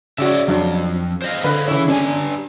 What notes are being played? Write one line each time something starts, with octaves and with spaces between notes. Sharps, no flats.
C#3 F#4 C#5 D5 E5
F2 F#3 D4
C5 D#5 F5
D3 B4
C#3 E3 E4 C#5
C#4 D4 G4 G#5